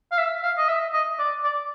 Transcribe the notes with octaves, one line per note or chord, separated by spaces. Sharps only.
F5
E5
F5
D#5
E5
D#5
D5
D5